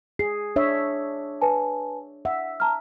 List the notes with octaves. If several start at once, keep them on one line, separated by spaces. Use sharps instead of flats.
G#4 C7
D4 C#5 E5
B4 G#5 A5
E5 F#5
A5 A#5 F6